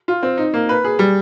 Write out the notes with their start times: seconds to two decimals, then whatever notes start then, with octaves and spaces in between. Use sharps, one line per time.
0.08 F4
0.23 C4
0.37 D#4
0.54 A#3
0.69 B4
0.84 G#4
0.99 G3